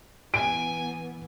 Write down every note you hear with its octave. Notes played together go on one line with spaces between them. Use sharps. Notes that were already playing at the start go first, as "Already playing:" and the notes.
E3 B3 G#5 D7